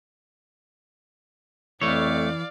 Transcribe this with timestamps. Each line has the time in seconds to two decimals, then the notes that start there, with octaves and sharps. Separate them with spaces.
1.82 F2 E3 A3 C#5 D5 F5